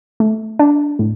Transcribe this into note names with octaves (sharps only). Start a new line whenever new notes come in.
A3
D4
A2